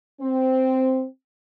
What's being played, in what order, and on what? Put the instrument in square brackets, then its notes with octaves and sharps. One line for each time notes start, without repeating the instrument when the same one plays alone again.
[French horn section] C4